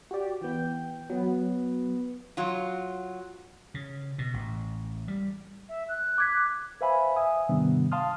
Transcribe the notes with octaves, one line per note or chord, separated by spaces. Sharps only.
F#4 G4 D5
E3 B3 G5
F#3 B3
F#3 F4
C#3
B2
A1
G3
E5
F#6
D6 G#6 B6
B4 C5 E5 F5 G#5 B5
E5 G#5 D#6
G#2 C3 D#3 G3 B3 D4
F5 A5 C6 D#6 F6